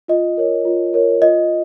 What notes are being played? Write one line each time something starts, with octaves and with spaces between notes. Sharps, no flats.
F4 D#5
A#4 C#5
F4
A#4 C#5
F4 D#5